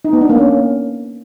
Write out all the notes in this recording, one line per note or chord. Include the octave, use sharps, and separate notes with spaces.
D#4
B3
D4
A#3
C#4